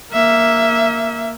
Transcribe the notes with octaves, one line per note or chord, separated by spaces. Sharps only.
A#3 E5